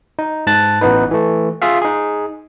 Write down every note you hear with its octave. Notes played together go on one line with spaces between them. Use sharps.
D#4
G#2 A5 F#6 A6
A1 E3 B3 D#4 B4
E3 A3
F4 G#4 E5 F5
D#4 G#4